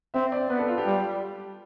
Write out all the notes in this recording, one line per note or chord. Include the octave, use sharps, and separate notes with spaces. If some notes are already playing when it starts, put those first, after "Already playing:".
C4 E5
D5
B3 B4
A4
F4
G4
G3